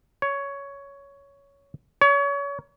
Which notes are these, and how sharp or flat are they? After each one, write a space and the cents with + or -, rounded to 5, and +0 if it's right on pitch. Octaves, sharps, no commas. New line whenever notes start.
C#5 +10
C#5 +30